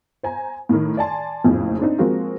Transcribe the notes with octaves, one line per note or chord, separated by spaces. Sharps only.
C5 G#5 A#5
A2 D#3
D5 G#5 A5 C6
F#1 B1 F2 A2 C#3
C4 D4 D#4
F3 G#3 A#3 C4 F#4